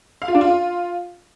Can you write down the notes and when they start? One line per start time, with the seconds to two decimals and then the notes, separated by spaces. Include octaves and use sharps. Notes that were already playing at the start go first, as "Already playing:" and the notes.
0.22 F5
0.28 F4
0.35 D4
0.41 F4